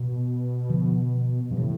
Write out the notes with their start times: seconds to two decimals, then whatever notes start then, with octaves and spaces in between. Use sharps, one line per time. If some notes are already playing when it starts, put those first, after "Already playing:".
Already playing: B2
0.69 D3 F3
1.51 G2 F3
1.57 A2 C3 E3